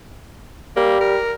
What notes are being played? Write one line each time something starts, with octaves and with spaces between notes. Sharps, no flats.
G3 A#3
A#4